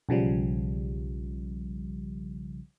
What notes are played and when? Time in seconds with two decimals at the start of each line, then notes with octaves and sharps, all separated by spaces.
0.09 B1 C#3 F3 G3